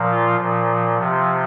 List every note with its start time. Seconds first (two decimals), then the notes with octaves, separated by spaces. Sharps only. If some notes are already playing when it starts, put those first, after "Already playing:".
Already playing: A#2 F3
0.11 F4
0.40 A#2 F3
0.98 C3 F3